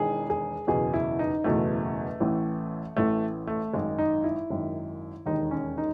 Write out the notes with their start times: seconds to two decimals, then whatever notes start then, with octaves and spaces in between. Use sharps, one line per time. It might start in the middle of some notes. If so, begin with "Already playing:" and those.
Already playing: E1 E2 D#3 G#4
0.30 G#4
0.67 F#1 E2 B2 G#4
0.94 E4
1.19 D#4
1.44 F#1 E2 B2 A3
2.20 A1 A2 E3
2.96 A1 A2 E3 A3
3.47 A3
3.73 G#1 F#2 D#3 G#3
3.98 D#4
4.24 E4
4.50 G#1 F#2 D#3
5.26 E1 D#2 D#3 D#4
5.51 C#4
5.78 D#4